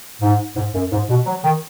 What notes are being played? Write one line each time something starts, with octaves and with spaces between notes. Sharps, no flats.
G#2
G#2
F#2
G#2
B2
F#3
D#3